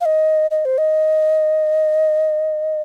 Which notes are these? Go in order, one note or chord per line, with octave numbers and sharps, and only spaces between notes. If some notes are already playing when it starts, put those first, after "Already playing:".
F5
D#5
D#5
C5
D#5